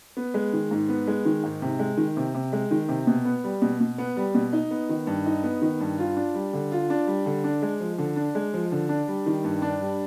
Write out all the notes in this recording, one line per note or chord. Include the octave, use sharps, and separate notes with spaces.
B3
G#3
D#3
G#2
B3
G#3
D#3
G#2
C3
G#3
D#3
C3
C3
G#3
D#3
C3
B2
B3
G3
B2
B2
B3
G3
B2
D#4
B3
D#3
G2
D#4
B3
D#3
G2
F4
D4
G3
D3
F4
D4
G3
D3
D4
G#3
F3
D3
D4
G#3
F3
D3
D4
G3
D#3
G2
D4
G3